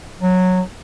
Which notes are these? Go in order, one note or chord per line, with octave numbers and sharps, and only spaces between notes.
F#3